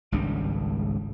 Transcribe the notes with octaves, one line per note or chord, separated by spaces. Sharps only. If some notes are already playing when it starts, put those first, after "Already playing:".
G#1 C#2 G3 D4